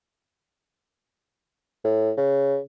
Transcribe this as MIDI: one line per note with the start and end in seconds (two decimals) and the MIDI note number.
1.85 2.12 45
2.17 2.58 49